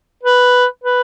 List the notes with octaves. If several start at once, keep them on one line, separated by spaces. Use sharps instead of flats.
B4
B4